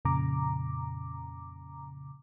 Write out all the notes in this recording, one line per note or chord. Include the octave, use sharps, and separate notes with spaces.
F2 A#2 C#3 A#5 D6